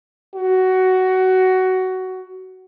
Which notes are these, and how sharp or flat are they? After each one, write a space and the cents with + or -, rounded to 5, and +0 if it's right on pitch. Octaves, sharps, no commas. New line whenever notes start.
F#4 +15